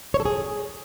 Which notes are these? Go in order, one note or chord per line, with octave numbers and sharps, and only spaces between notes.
C#5
A4
G#4